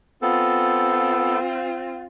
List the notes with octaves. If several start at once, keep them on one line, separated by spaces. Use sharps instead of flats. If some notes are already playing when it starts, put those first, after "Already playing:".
B3 C4 F4 A4